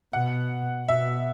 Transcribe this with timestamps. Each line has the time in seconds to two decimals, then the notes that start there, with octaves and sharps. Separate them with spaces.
0.13 B2 F#5
0.88 B2 E5